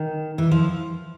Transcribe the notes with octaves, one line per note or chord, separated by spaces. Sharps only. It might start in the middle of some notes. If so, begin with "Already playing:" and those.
Already playing: D#3
E3
F3